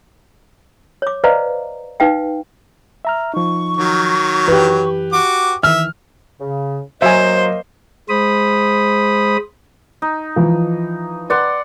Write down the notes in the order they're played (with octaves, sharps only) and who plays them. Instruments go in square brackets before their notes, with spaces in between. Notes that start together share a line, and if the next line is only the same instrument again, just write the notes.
[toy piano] C#5 D6
B4 C5 D5 D#5 F5 A#5
D#4 B4 F5 G5
[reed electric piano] E5 A#5 F6
[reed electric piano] F3 D#4 [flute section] C#6
[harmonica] D#3 F#3
[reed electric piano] F#2 E3 [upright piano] G4 B4
[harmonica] F#4 D6
[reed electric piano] D#3 E3 [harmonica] E5 [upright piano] F6
[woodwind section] C#3
[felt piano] F#3 [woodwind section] A#3 D#5 [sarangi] C5 [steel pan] E5 G#5
[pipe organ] G#3 C5 B5 D#6
[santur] D#4
[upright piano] E3 F3
[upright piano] B4 [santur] D5 F#5 C6